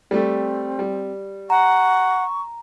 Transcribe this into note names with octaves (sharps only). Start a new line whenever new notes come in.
G3 A3 C4
G3
F#5 A#5 C#6